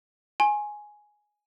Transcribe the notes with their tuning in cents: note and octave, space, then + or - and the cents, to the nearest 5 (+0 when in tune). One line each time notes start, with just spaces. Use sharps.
G#5 +5 C6 +45